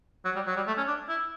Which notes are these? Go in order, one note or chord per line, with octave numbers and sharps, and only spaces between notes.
F#3
G3
F#3
G3
A3
C#4
D4
E4